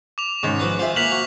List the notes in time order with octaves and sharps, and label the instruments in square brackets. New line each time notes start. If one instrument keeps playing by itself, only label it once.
[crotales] D6 F7
[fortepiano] G#2 D#3 [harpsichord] C#4
[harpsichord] F3 B4 D#5
[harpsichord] F4 G#4 [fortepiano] C5 E5
[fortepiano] A#3 [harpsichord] F#5 [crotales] B6 F7 F#7
[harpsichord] F#4